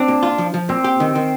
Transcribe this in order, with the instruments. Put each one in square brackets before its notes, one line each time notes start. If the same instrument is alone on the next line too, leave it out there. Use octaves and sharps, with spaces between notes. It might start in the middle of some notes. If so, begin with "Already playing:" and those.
Already playing: [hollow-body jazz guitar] C4 [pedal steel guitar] D4
[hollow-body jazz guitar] A#2
F4
F3
F3
[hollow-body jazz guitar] A#2 [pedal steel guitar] C4
[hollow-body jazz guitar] G4
D#3
D#3